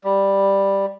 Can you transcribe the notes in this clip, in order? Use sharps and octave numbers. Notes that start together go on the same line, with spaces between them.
G3